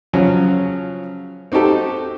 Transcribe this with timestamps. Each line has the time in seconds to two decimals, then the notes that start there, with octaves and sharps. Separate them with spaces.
0.13 C#3 F3 F#3 C#4
1.52 C4 D#4 F#4 G4 A4